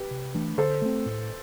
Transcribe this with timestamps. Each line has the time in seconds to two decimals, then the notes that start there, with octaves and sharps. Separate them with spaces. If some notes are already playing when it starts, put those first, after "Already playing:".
Already playing: G4 B4
0.11 C3
0.34 E3 A3 D4
0.58 D3 A4 C5
0.82 A3 C4
1.06 A2